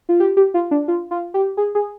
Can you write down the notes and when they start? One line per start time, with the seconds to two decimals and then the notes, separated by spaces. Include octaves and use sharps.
0.09 F4
0.20 G4
0.37 G4
0.54 F4
0.71 D4
0.88 F4
1.11 F4
1.34 G4
1.57 G#4
1.75 G#4